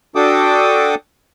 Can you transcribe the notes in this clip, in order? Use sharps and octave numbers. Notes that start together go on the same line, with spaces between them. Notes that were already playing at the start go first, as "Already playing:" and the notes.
D4 F#4 A4 G5 D6 D#6